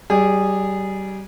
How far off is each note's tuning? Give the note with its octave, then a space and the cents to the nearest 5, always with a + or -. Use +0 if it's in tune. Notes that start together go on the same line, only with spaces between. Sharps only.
G3 -30 G#4 -15 D5 +45